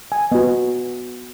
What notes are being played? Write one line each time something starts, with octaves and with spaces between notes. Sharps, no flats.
G#5
B3 F#4 D#5